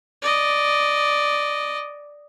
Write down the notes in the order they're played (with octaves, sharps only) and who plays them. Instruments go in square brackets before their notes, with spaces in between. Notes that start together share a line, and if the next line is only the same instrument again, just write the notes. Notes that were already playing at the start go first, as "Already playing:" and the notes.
[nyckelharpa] D5 D#5